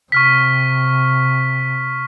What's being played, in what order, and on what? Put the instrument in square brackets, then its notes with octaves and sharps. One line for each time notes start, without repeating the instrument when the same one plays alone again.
[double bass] C3 [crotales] C#6 F6 B6